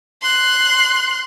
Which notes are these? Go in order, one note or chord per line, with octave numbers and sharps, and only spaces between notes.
C6 F#6